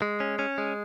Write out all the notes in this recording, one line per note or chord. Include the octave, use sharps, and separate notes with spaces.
G#3
C#4
C#4
G#3